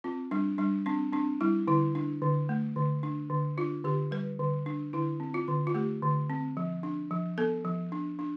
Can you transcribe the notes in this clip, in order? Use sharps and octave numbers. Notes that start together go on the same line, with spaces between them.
C4 F4
G3 D4
G3 D4
C4 D4
C4 D4
G3 E4
D3 E4
D4
D3
A3
D3
D4
D3
D4 F4
D3 G4
G3 B4
D3
D4
D3 E4
C4
F4
D3
F4
A3 G4
D3
C4
F3
D4
F3
B3 A4
F3
D4
D4